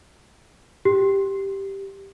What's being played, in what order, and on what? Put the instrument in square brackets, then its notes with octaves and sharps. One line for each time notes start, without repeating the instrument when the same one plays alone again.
[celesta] G4